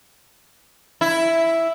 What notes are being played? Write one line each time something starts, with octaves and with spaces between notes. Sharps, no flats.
E4